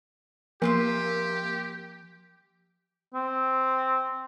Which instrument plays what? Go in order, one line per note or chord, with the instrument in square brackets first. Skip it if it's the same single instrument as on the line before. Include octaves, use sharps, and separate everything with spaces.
[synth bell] F3 [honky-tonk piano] A#3 [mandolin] C4 F4 E5 [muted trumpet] G4
[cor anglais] C4